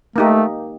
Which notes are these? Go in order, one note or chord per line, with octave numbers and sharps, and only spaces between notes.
A3 A#3 D#4 G4